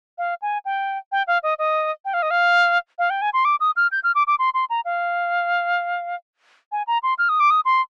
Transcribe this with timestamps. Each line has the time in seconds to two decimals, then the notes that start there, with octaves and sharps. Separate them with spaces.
0.18 F5
0.42 G#5
0.65 G5
1.12 G5
1.27 F5
1.43 D#5
1.59 D#5
2.05 G5
2.14 F5
2.22 D#5
2.30 F5
2.98 F5
3.10 G5
3.22 G#5
3.33 C6
3.45 D6
3.60 D#6
3.76 F6
3.92 G6
4.03 F6
4.15 D6
4.27 D6
4.39 C6
4.54 C6
4.70 A#5
4.85 F5
6.72 G#5
6.87 A#5
7.03 C6
7.18 F6
7.29 D#6
7.40 D6
7.50 D#6
7.65 C6